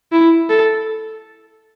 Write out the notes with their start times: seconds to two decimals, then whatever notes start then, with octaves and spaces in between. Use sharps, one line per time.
0.12 E4
0.50 A4